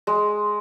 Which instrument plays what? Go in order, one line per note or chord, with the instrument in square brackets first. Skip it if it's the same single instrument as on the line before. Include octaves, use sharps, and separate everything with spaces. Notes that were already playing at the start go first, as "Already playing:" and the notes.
[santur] G#3